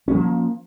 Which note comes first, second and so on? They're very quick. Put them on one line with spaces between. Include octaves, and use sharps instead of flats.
C#4 G3 F3 A#3